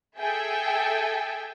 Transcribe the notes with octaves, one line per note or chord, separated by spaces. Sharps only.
G#4 A4 E5 G5 G#5